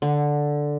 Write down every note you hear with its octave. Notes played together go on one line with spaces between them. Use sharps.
D3